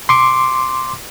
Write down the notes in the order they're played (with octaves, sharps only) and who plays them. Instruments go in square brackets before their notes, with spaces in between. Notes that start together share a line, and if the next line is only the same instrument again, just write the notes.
[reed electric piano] C6 D6